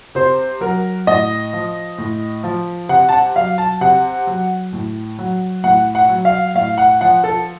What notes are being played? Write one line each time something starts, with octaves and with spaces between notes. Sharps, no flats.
C3 C5
F#3 A#4
A2 D#5
F3
A2
F3
C3 F#5
A5
F#5
F#3 F5
A5
C3 F#5
F#3
A2
F#3
A2 F#5
F#5
F#3
F5
A2 F5
F#5
F3 F#5
A4